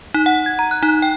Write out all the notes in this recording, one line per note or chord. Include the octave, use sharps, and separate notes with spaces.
D#4
F#5
G#6
A#5
F#6
D#4
G5